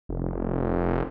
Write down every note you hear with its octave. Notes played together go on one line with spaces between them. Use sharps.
F1